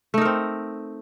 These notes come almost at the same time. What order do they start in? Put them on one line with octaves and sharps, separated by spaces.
A3 D#4 A#4 C4